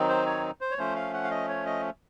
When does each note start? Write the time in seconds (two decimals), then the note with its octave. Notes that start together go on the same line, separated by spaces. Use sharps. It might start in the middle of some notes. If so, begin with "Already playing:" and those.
Already playing: D#3 F#3 C4 D#4
0.09 C5
0.26 C#5
0.61 C5
0.71 C#5
0.78 F3 A3 C#4 C5
0.96 F5
1.13 F#5
1.24 F5
1.31 D#5
1.49 C#5
1.66 D#5